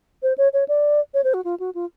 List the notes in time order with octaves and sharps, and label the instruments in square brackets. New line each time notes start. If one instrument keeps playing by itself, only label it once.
[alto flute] C5
C#5
C#5
D5
C#5
C5
F#4
F4
F#4
F4